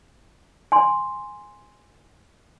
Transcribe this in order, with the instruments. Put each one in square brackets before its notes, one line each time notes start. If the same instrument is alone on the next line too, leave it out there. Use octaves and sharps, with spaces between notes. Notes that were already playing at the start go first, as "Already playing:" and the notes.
[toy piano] G#5 C6